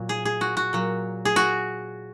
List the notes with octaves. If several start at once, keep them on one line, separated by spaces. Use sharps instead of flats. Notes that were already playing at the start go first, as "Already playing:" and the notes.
Already playing: A#2 F#3
G#4
G#4
F#4
F#4
A#2 F#3
G#4
F#4